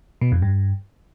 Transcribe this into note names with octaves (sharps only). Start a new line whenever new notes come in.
B2
F2
G2